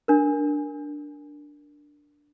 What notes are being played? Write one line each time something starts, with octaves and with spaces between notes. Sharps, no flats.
D4 A#4